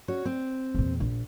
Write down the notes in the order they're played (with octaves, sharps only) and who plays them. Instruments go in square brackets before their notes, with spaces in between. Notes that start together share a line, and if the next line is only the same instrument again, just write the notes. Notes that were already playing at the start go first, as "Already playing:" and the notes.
[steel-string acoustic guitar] C#4 F#4 C#5
C4
[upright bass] E2 A#2
A#1